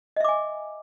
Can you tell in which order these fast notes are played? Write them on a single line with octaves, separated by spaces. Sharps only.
D#5 E5 D6 G#5